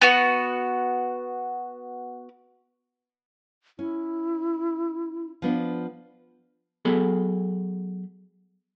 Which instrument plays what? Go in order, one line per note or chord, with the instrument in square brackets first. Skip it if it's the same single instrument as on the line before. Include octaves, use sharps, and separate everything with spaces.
[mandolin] B3 F#4
[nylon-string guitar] C#4 [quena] E4
[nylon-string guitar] F3 B3 D4
[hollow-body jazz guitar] F#3 B3 G#4 A4 B5